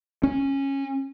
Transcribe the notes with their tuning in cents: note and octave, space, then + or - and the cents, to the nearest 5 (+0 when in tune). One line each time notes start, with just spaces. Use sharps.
C#4 -15